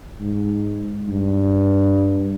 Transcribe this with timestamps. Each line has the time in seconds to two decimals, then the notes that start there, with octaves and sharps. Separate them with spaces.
0.20 G#2
1.08 G2